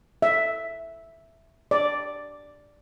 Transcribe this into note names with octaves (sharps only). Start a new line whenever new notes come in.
E5
D5